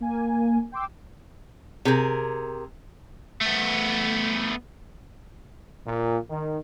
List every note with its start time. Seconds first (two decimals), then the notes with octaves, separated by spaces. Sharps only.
0.01 A#3 G#5
0.72 G5 C6 D6 E6
1.85 C3 G#4 A#4
3.41 A3 B3
5.86 A#2
6.29 D#3